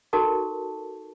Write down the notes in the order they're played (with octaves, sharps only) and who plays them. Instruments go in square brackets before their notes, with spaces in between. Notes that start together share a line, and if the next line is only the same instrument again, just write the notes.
[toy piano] D#4 F#4 A4 A#4 A5 C#6